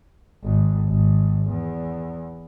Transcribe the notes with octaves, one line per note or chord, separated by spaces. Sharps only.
G#1
G#1
E2